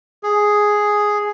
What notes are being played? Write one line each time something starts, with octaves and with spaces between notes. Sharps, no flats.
G#4